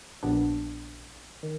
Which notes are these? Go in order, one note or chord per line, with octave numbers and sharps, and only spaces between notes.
A#1 A#2 G3 B3 D4
D#3